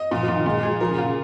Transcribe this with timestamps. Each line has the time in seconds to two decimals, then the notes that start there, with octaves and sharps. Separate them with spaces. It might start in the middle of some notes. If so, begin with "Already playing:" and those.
Already playing: D#5
0.11 A#2 F3
0.23 F3
0.28 A#2
0.35 D#3
0.46 A#2 G#3
0.58 G#3
0.63 G#4
0.69 F3
0.80 F3 A#4
0.89 C#3
0.98 A#2 F4
1.06 C#3